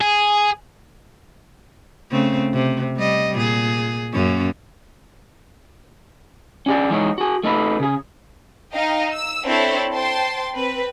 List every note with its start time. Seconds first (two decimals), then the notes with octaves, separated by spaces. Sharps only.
0.01 G#4
2.11 C#3 A3 C4
2.53 C3
2.97 G3 D#5
3.35 A#2 G#4
4.13 F#2 A#3 C#4
6.66 C#4 D4 F#4 G#4 D5
6.90 E3 G#3 D#4 C#5
7.18 F#4 G#4
7.43 A3 D#4 A4 B4
7.80 C#3 G#4
8.72 D#4 D#5 F5 G5
9.11 E6
9.44 C4 D4 E4 A4 C5 C#5
9.92 C5 G5 A5 C6
10.53 C4 B4